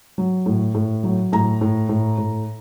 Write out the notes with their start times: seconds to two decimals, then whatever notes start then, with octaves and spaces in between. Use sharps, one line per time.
0.18 F#3
0.46 A2
0.75 A2
1.04 F#3
1.33 A2 A#5
1.61 A2
1.89 A2
2.18 A2